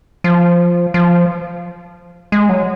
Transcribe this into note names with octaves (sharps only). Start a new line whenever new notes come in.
F3
F3
G#3
F#3